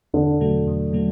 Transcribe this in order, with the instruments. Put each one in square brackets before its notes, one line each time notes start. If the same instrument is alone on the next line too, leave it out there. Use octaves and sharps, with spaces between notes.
[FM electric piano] E2 [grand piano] D3
[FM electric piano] B2 F#3 A3
E2
B2 F#3 A3